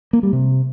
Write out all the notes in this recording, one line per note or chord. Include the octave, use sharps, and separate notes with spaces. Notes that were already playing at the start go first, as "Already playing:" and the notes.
A#3
G3
C3